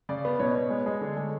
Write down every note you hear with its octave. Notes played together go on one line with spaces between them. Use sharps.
C#3 D5
B3
B2 C#5
B3
G#3
G#3
D3
G#3